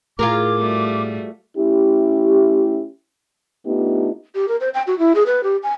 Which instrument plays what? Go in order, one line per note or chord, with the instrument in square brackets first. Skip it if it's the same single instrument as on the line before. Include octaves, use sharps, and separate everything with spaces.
[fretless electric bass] A2 [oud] F4 G#4 A#4 [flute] D6
[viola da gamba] G3 A3 F#4
[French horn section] A3 C#4 E4 G4
A3 B3 D4 D#4 F4 G4
[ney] G4
A#4
C5
G5
F#4
E4
G#4
B4
G4
G#5